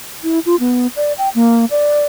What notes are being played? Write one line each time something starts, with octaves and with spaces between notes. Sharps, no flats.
E4
F4
B3
D5
G5
A#3
D5